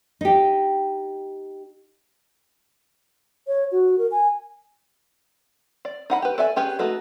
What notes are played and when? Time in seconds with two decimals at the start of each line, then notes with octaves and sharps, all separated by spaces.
0.21 D#4 G4
3.47 C#5
3.72 F#4
3.98 A#4
4.11 G#5
5.85 D5
6.10 D#4 F#5 B5
6.22 G4 B4
6.38 A4 D5 E5 G#5
6.56 C#4 G4 G#4 B4
6.79 A3 D#4 F#4 A4 B4